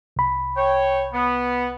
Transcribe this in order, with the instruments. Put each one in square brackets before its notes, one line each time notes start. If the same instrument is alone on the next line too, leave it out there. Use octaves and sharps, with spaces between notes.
[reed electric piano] C2 B5
[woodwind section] C#5 G5
B3